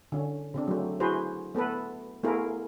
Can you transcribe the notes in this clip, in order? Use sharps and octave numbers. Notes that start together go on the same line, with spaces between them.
D3 C#4
C#3 C4 D4
F#3 A3
E4 F#4 G#4 B4 C5
A3 B3 A4 B4
A3 B3 E4 F4 G#4 A#4